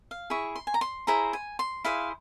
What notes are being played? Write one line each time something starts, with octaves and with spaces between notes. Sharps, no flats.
F5
E4 G#4 C#6
C6
G#5
A#5
C6
E4 G#4 C5 A#5
G#5
C6
E4 G#4 C5 F5